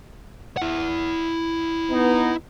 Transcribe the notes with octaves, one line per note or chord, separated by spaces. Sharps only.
E4 F#5
B3 D#4